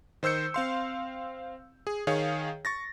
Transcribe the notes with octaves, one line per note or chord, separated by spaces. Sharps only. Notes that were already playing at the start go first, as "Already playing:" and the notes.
D#3 C5 E6 G6 C#7
C4 F5 C6
G#4
D#3 G#4 C#5 F5
C#6 A6 A#6